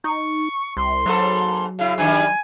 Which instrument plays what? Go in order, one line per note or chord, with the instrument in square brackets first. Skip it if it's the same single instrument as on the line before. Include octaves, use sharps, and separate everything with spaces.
[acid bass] D#4 [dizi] C#6
[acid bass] C2 [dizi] C6
[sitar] G#2 A#3 A4 [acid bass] F#3
[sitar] C#3 E4 [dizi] F5
[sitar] F#2 D#3 G3 [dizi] G#5